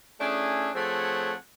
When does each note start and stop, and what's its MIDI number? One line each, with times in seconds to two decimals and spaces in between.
0.21 0.69 57
0.21 0.69 61
0.21 0.69 62
0.21 0.69 64
0.21 0.69 68
0.75 1.34 53
0.75 1.34 57
0.75 1.34 60
0.75 1.34 68
0.75 1.34 73
0.75 1.34 78